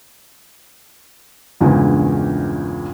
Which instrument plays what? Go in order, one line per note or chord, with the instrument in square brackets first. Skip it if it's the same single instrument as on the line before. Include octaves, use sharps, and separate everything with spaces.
[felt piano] A#1 E2 G2 A#2 C#3 G#3